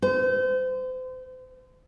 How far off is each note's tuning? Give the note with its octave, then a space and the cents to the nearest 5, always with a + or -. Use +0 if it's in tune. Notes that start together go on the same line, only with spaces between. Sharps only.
C5 -35